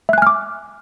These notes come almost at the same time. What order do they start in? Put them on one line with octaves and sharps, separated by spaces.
E5 F#6 G#5 F6 D6